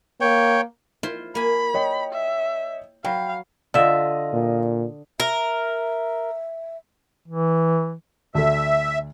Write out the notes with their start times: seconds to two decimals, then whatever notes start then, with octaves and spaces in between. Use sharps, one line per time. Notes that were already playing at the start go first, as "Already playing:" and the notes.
0.21 A#3 C#5 G5
1.03 E4 F4 C5
1.35 A#3 G#5 B5
1.74 C#5 D#5 G5
2.13 E5
3.05 F#3 F5 G5 B5
3.74 D3 F4 D#5 E5
4.33 A#2
5.20 A#4 E5
7.28 E3
8.35 D2 A4 E5